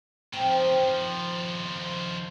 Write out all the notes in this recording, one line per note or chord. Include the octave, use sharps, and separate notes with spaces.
D#3 F3 C4